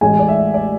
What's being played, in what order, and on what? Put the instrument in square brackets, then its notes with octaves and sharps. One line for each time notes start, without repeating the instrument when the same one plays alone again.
[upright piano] A1 A2 G#3 G#5
D5
E5
D5